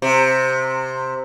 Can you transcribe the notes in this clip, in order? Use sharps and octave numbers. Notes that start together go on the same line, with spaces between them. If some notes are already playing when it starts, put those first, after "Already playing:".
C3